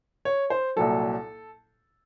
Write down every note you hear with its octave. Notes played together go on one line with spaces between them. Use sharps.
C#5
C5
C2 A#2 F#3 A4